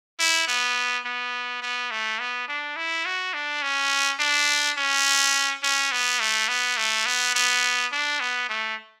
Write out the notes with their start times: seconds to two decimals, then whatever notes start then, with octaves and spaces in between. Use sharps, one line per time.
0.19 E4
0.48 B3
1.05 B3
1.62 B3
1.91 A3
2.20 B3
2.48 D4
2.77 E4
3.05 F#4
3.34 D4
3.62 C#4
4.20 D4
4.77 C#4
5.63 C#4
5.92 B3
6.20 A3
6.49 B3
6.77 A3
7.06 B3
7.35 B3
7.92 D4
8.20 B3
8.49 A3